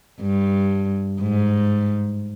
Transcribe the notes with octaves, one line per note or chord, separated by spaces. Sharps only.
G2
G#2